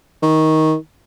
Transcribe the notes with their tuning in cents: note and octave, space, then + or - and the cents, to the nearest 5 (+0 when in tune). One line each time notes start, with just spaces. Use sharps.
D#3 +15